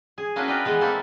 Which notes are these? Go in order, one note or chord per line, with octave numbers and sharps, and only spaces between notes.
G#4
A#3 C#4 D4 E4 F#4 B4
A#4 B4 D5 D#5 G5
E3 G#3 B3
A#3 C4 E4 G4 A4 D5